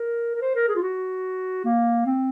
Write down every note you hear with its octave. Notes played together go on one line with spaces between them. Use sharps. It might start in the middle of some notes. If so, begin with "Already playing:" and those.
Already playing: A#4
A#4
C5
A#4
G#4
F4
F#4
A#3
C4